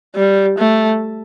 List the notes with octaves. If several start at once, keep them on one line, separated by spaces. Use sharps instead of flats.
G3
A3